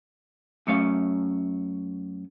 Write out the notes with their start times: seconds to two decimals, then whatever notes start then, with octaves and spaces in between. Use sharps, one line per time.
0.67 F#2 A3 C#4 F5